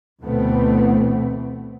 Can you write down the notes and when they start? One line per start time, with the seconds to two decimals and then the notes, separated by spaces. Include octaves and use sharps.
0.22 D2 B2 E3 A3 B3 C4